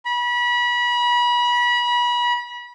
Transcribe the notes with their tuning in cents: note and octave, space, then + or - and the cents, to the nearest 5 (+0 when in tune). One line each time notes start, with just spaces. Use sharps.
B5 -30